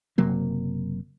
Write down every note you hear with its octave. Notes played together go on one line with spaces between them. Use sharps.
F#1 C3 F#3 A#3